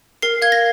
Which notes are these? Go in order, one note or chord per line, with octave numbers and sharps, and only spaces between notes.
A#4 C7
F5 G#6
A#6